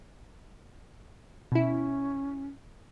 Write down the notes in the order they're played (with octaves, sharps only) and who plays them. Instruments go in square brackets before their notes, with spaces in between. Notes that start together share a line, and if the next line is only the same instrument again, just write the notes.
[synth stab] B2 E4 [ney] C#4